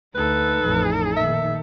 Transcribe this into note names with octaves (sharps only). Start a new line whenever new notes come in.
D2 D#4 A4 B4
A1 F2
A#2 D#3 E5